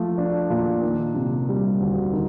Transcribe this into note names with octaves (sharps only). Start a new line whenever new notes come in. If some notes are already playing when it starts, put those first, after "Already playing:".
Already playing: F3 A3
D4
A#2
D#3
C3
G3
D2
D#3